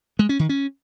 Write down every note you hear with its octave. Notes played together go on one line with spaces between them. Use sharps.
G#3
C#4
D#3
C#4